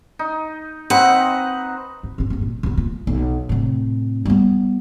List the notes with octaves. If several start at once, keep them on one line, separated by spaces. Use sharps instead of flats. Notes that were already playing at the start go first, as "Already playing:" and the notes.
D#4
C4 D#4 B4 F#5
G#1
G1 C#4
F#1 E2
A#2
C#3 B3
A#3 F4
B1
A2 C3
G3 B3